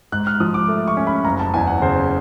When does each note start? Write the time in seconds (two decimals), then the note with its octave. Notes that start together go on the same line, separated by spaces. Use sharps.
0.12 G#2 F#6
0.27 F6
0.40 F3 D#6
0.54 D6
0.68 A3
0.88 C#6
0.97 C#4
1.07 B5
1.25 F#1 A#5
1.39 A5
1.54 E2 G#5
1.67 F#5
1.82 C#3 C5